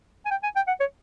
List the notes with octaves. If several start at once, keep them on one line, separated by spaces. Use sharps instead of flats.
G#5
G5
G#5
G5
F#5
C#5